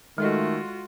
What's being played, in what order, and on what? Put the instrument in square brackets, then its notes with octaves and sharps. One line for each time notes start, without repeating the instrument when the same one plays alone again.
[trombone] D#3 [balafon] G#3 A4 D#5 [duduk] A3 [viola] F4 F#4